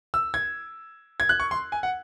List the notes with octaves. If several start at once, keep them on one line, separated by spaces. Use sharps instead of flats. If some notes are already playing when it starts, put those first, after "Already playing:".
E6
G#6
G#6
F#6
C#6
C6
G#5
F#5